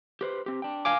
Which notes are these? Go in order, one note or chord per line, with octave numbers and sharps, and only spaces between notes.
G4 B4 C5
C4 G4
D4 G5
F5 G#5 D6